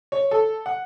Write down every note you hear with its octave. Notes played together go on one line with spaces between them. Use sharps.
C#5
A4
F#5